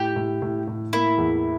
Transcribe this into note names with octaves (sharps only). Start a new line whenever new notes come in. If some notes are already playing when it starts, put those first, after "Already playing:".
Already playing: A2 G4
A2
A2
A2
A#3 E4
E2